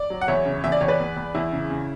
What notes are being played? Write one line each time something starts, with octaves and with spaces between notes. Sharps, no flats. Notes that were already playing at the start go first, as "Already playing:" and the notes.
Already playing: D5
F#3
F#5
E2 C#5 E5
C#3
E2 E5
D5
E2 C#5
B4 D5
E2
E2
E2 E4
C#3
C#3